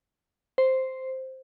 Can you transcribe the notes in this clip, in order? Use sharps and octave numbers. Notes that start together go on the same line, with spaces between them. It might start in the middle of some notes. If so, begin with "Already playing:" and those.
C5